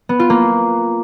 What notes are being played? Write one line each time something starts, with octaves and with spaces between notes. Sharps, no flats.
B3
F4
A#3